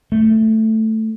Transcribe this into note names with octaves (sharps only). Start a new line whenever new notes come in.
A3